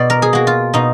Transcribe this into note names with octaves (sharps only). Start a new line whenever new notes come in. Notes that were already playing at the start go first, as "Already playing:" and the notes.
Already playing: B2 D5
A#4
G#4
A#3 F#4
F4
B2 D#4